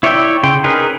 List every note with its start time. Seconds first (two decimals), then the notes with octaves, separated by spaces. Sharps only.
0.03 E4 C#5 D5 E5 G5
0.43 C#3 G5 C6
0.64 C#4 D#4 G#4 A#4 B4